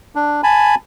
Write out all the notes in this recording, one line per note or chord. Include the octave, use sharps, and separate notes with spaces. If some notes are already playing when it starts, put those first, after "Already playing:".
D4
G#5 A5 B5